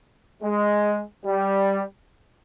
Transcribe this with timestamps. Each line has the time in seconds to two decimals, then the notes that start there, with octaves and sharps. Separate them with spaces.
0.43 G#3
1.25 G3